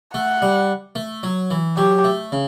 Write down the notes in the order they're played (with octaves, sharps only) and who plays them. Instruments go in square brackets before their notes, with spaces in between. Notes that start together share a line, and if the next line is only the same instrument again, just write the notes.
[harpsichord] A3 [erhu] F#5
[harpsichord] G3
A3
F#3
E3
[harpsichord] F#3 [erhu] G4
[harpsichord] A3
C#3